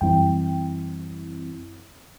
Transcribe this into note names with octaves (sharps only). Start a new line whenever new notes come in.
F#2 E3 G3 C4 E4 G5